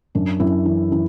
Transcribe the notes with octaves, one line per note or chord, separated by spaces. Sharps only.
F#2 D4
F#2 C#4 E4
E3
E3